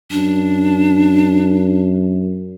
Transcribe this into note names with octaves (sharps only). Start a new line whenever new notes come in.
F#2 D4